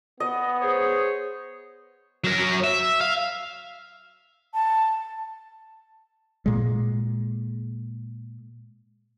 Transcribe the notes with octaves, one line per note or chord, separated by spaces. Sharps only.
B3 D#5
G#4 C5 C#5
F#3 A#4
E5
F5
A5
A#2 G#3